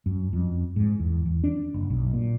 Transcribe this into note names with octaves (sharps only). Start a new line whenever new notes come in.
F#2
F2
G#2
E2
E2
D4
F#1
B1
A#2